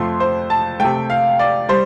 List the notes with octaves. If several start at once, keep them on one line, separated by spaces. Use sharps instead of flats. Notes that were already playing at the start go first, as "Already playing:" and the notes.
Already playing: F2 F3 A3 C6
C5
A5
C3 A3 G5
F5
D5
G3 C5